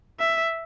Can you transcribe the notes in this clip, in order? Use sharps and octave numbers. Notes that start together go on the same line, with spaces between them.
E5